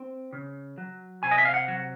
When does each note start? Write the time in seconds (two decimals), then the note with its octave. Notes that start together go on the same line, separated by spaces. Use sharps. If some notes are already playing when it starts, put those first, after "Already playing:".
Already playing: C4
0.33 C#3
0.78 F#3
1.23 C3 G#5
1.31 D#5
1.38 E5
1.45 F5
1.54 F#5
1.68 F#3